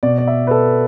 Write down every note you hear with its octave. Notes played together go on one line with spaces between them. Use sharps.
B2 D5
D5
E5
B4
A4